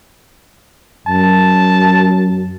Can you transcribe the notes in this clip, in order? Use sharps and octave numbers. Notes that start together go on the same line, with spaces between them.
F#2 A5